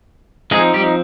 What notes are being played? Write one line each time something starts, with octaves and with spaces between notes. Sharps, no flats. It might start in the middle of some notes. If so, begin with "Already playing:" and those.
F3 G#3 C4 D#4 G#4
G3 G4